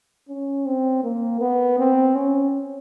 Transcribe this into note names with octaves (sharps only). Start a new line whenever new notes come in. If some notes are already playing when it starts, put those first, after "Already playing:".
C#4
C4
A#3
B3
C4
C#4